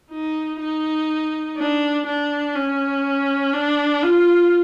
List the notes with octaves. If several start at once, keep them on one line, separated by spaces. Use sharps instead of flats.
D#4
D#4
D4
D4
C#4
D4
F4